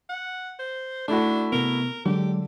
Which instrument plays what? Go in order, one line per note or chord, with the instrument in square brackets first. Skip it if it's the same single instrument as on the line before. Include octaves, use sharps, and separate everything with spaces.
[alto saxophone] F#5
C5
[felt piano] A3 E4 F#4 [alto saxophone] D4
[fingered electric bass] C3 B3 [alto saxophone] A#4
[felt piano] D3 [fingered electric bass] F#3 G#3 [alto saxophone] G4